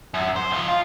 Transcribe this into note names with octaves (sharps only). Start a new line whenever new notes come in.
F#2
C5
C#2 F3
F4